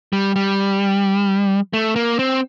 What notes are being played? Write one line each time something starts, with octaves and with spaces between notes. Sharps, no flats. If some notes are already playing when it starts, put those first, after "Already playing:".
G3
G3
A3
A#3
C4